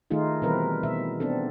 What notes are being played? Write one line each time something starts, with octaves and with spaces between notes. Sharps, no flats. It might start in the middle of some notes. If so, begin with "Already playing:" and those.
D#3 A3 D#4 F4 G#4
B2 E3 G3 C4 A#4 B4
B2 E5
B3 C4 D4 A4